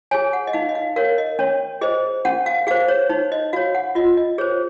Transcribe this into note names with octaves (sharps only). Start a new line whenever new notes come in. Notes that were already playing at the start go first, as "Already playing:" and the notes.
G#4 C#5 G#5
F#5
D#5
D#4 F5
D#5
F5
A#4 C#5 F5
D#5
C#4 C#5
G#4 C5 D#5
C#4 F#5
F5
G#4 C5 F5
C#5
D#4 C#5
D#5
F#4 C#5 F5
F#5
F4 D#5
D#5
G#4 C5 C#5